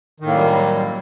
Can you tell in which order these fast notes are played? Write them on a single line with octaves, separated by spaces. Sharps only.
D#3 A2 A#3 F#2 G3